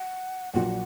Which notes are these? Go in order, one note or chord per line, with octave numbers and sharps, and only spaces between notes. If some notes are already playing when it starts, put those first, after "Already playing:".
Already playing: F#5
A#1 A#2 F#3 F#5